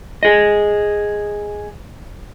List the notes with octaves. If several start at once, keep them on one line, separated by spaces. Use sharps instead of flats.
G#4 D#5